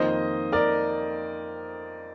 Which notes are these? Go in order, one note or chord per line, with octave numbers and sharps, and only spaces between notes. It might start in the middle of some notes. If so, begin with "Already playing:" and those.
Already playing: F2 D#3 A#3 C5 D#5
A#4 D5